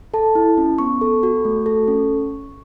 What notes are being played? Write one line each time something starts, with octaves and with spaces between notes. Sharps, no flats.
A4 A5
E4
C#4
B3 C#6
A4
F#4
A3
A4
C#4